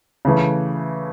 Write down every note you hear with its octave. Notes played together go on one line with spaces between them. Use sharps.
C#3 E3 A3